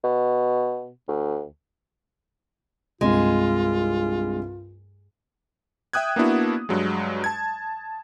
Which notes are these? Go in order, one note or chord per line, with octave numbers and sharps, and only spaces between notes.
B2
D2
C2 G2 G#3 C4 F4
E5 G5 D#6 F#6 G#6
A#3 B3 D4 E4 F#4
G2 F#3 G#3
A5 G#6